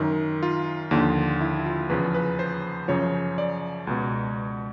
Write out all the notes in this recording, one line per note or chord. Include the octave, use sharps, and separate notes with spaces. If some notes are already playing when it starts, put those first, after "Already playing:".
Already playing: F#2 D#3
F4
D#2 D3 F3
E4
E4
F4
E2 C#3 F3 B4
B4
C5
F#2 C#3 F3 C#5
D5
C#2 B2